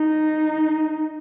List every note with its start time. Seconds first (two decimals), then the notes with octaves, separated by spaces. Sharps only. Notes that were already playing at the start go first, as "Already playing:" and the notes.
Already playing: D#4